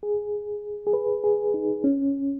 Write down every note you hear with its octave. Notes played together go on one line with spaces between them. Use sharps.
G#4
G#4
B4
G#4
D#4
C#4